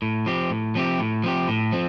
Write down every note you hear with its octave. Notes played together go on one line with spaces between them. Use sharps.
A2
F3 C4 G4
A2
F3 C4 G4
A2
F3 C4 G4
A2
F3 C4